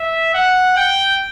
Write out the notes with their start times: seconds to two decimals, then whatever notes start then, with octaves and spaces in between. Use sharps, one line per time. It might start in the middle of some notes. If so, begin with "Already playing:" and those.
Already playing: E5
0.34 F#5
0.77 G5